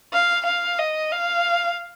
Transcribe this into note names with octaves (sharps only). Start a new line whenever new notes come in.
F5
F5
D#5
F5